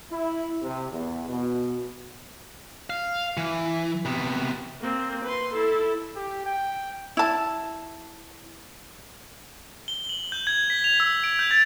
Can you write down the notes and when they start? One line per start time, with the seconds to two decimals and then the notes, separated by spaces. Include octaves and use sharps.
0.11 E4
0.62 C3
0.92 E2
1.29 B2
2.90 F5
3.37 E3
4.05 C3 B3
4.80 A#3 C4
5.25 B4 C6
5.54 E4 A4
6.16 G4
6.46 G5
7.17 E4 A5
9.88 G7
10.09 F#7
10.32 G6
10.47 G#6
10.70 B6
10.84 F7
11.00 E6
11.24 D7
11.39 G6
11.51 A6